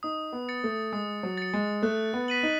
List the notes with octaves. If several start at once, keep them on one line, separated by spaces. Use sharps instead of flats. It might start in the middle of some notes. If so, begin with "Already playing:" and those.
D#4 D#6
B3
A6 C#7
A3
G#3 D#6
F#3
A6 C#7
G#3
A3 F#6
B3
B6 D#7 F#7
D#4